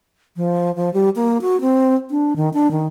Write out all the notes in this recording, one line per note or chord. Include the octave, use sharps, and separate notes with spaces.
F3
F3
G3
A#3
F#4
C4
D4
D#3
D4
D#3